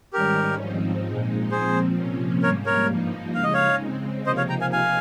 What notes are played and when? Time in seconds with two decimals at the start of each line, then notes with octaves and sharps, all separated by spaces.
0.13 G#2 D#3 G3 C#4 G4 A#4
0.60 G#2 F3 C4 D#4
1.06 A#2 G#3 D#4
1.51 A#2 F3 C4 G#4 C5
1.97 C3 F3 A#3 C#4
2.42 G#2 G3 A#3 A#4 C#5
2.66 A#4 C#5
2.89 G2 F3 A#3 D#4
3.35 C#3 G#3 D#4 F5
3.44 D#5
3.53 C#5 F5
3.81 C#3 G#3 C4
4.26 C3 F3 A#3 D#4 C5 D#5
4.37 C#5 F5
4.49 G5 A#5
4.61 F5 G#5
4.72 F5 G#5